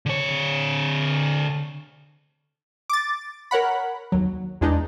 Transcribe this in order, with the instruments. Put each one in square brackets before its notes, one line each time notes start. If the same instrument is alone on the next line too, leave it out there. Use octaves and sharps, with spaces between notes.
[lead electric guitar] D3 C#5
[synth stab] D6 A6
A#4 C#5 F#5 B5
D#2 F#3
E2 G#3 D4 D#4